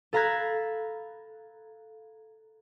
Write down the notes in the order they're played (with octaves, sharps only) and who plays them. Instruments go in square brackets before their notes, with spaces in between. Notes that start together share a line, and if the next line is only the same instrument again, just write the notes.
[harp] A4 F5 A#5 B5 F#6 G#6